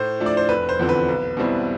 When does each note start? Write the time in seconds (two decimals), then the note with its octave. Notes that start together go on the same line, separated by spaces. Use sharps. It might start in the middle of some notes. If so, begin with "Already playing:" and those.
Already playing: A2 C5
0.20 F3 A3 D4
0.26 D5
0.37 C5
0.49 F1 B4
0.69 C5
0.79 E2 D3 F3 C4
0.89 B4
1.09 B1
1.37 B2 G3 C4 E4